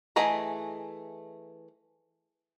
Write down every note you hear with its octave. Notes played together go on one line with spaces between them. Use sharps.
E3 A3 G#4 D#5 A#5